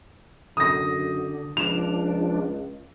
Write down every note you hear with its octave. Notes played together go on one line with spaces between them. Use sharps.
F#2 D3 D#6 A#6
C#2 F3 D4 E7 F7